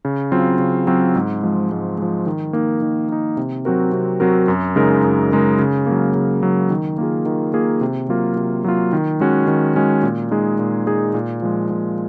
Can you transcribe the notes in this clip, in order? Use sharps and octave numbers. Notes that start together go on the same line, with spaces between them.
C#3
F#3 C4 F4
C#3
F#3 C4 F4
G#2
F3 G#3
G#2
F3 G#3
D#3
A#3 D#4
D#3
A#3 D#4
C3
F#3 C4 F#4 A#4
C3
F#3 C4 F#4 A#4
F#2
C#3 G#3 D#4 A#4
F#2
C#3 G#3 D#4 A#4
C#3
F#3 A#3
C#3
F#3 A#3
D#3
A#3 F4 G#4
D#3
A#3 F4 G#4
C3
F#3 A#3 F4
C3
F#3 A#3 F4
D#3
G#3 C#4 F#4
D#3
G#3 C#4 F#4
A#2
G#3 D#4 G#4
A#2
G#3 D#4 G#4
A#2
F3 G#3
A#2